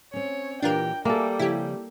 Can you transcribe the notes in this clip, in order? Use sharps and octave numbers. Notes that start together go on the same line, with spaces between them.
C4 C#4 C#5
A#2 E3 D4 F4 G4 A#4 G5
G3 A#3 F#4 G#4 A4 E5
C#3 F3 C4 E4 G4